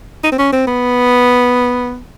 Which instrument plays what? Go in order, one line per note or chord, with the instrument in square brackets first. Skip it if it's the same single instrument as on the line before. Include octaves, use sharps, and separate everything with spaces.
[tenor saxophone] D#4
C4
C#4
C4
B3